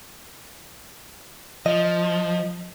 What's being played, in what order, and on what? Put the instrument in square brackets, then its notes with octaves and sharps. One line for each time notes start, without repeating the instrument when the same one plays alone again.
[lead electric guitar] F3 [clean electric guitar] D#5